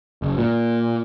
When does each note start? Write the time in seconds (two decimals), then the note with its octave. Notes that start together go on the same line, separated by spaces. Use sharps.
0.22 F#1
0.38 A#2